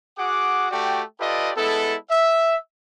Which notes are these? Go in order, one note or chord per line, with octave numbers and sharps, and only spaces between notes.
F#4 G#4 F#5 D6
A3 F#4 G4 D5 G5
F4 G4 A4 B4 D5 D#5
G#3 B3 E4 A4
E5